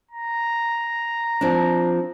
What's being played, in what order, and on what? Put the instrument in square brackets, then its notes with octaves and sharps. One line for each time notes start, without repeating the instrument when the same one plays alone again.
[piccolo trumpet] A#5
[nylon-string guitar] F3 C4 D4